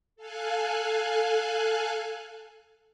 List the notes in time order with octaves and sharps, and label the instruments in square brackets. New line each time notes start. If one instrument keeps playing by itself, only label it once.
[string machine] A4 F5 G#5 F#6